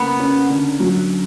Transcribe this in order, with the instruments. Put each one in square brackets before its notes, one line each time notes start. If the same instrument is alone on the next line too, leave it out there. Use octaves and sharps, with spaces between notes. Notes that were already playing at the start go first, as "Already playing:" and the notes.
Already playing: [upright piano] C#3 A#3 [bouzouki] B3
[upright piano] C#4
D3
F#3